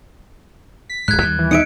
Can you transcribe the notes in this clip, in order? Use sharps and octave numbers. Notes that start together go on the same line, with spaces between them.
B6
D1 G#2 F#6 G#6
D#2 G3
E3
D#4 E5 C#7 D7